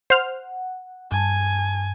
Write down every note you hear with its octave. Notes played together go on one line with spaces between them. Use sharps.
C5 F#5 F6
G2 G#5 A5